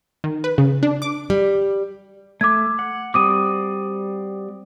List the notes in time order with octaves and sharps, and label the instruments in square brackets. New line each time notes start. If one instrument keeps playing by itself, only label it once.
[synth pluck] D#3
B4
C#3
D4
D6
[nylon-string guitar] G3
[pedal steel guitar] A3 E6 [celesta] D6 G#6
[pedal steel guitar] F#5
[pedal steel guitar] G3 C4 F#4 [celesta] D6 D#6 D#7